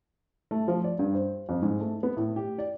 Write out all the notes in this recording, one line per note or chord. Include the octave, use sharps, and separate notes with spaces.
A3
F3
D5
G2
C5
F2
G#2
A3
B3
A2
G4
D5